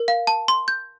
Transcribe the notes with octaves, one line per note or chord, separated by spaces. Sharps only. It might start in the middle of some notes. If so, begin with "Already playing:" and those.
Already playing: A#4
F5
A5
C6
G6